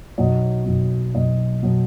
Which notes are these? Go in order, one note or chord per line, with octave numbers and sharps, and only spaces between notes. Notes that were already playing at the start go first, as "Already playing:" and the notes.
B1 B2 F#3 D#5
B1 B2 F#3
B1 B2 F#3 D#5
B2 F#3